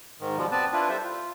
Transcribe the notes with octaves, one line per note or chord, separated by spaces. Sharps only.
G#2 D#3
B2 F3 G3 G#3
B3 C4 B4 D5 A5
D4 E4 F4 B4
G3 A4 C5 E5
F4